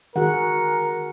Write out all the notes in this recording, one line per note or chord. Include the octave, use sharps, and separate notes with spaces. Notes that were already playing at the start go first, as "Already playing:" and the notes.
D#3 F#4 G#4 A#4 F#5